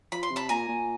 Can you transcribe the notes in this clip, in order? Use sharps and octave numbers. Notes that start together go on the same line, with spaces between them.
F3 B5
C6
C3
A5 B5
A#2 G#5 A#5
A#2